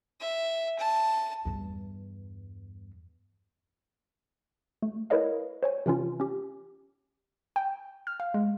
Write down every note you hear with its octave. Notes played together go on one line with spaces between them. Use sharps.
E5
A5
E2 G2
A3
E4 A#4 B4 C#5 D#5 F5
C5 C#5 G#5
C3 E3 C#4 F4
C#4 G4
G5
F6
F5
G#3